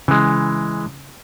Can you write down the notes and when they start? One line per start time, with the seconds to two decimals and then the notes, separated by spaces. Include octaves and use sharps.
0.08 C#3 E3 G#3 C#4